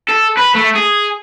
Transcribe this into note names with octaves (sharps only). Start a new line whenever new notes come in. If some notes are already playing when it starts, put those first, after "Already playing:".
A4
B4
A3
G#4